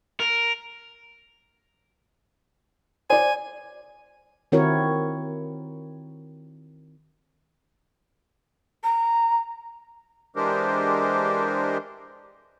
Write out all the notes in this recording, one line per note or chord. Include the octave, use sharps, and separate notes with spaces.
A#4
C5 D5 G#5
D#3 C4 E4 F#4 A#4 C#5
A#5
E3 G#3 D4 G4 A#4 C5